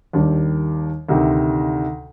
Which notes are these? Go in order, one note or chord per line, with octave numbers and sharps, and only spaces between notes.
D#2 D#3 G3 D4
D2 C3 D#3